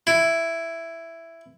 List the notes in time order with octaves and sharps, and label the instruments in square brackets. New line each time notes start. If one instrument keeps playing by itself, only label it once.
[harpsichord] E4